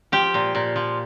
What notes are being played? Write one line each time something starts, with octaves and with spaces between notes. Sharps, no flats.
F3 G4
A#2
A#2
F3